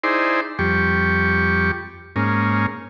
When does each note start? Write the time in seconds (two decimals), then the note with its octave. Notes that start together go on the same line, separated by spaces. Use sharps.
0.03 D#4 E4 G#4 C5 D5 C6
0.59 F2 G3 G4 C#6
2.16 G#2 A#3 C#4